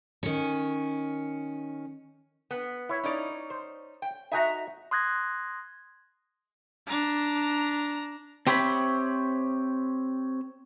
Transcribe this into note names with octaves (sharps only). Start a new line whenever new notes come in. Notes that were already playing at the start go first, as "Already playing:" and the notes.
D#3 C#4
B3
E4 C#5
C#4 D#4 D5
C5
G5
D#4 F#4 E5 G#5 A#5
C6 D#6 F#6 G#6 A#6
D4 A#5
C4 G4 C5 C#5 E5 B5